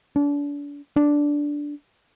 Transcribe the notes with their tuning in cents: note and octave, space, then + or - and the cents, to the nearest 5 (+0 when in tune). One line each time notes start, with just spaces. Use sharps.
D4 -35
D4 -5